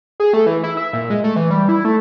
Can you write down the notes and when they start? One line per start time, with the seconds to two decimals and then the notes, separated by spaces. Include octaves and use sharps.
0.20 G#4
0.33 A3
0.46 E3
0.63 E4
0.77 E5
0.93 A#2
1.10 G#3
1.24 A3
1.36 E3
1.51 G3
1.69 E4
1.85 A3